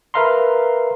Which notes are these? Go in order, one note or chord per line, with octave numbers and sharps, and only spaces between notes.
A#4 B4 E5 F5 A#5 C6